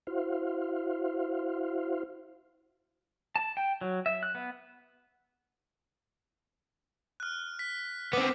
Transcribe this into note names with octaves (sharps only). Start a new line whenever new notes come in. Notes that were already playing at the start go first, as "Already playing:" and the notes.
E4 F#4 C5 F5
A5
G5
F#3
E5
F#6
B3
F6 F#6
B6
B3 C4 D6